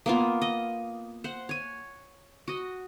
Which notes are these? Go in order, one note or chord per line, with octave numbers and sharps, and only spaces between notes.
A#3 B3 F4
D#5
C5 F#5
C#5 G#5
F#4 D#5